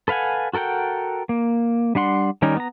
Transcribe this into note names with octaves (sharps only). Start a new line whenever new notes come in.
A4 B4 F5 F#5 G#5
F#4 A4 A#4 F#5 G5
A#3
G3 D4 F#5 C6
D#3 G3 C#4 D#4 A#4
B3 A#5